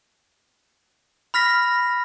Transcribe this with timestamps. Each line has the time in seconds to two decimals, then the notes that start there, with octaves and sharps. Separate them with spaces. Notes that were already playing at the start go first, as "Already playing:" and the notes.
1.34 B5 F6 A#6 B6